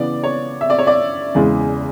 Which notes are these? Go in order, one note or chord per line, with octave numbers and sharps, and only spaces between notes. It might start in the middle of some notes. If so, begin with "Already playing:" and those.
Already playing: C#3 E3 B3 D5
C#5
E5
D5
C#5
D5
E2 C#3 E3 G#3